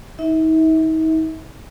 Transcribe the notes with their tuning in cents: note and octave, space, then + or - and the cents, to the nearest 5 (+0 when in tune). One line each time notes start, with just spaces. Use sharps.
D#4 +40 E5 -30